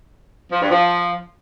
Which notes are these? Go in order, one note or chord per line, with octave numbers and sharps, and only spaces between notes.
F3
G2
F3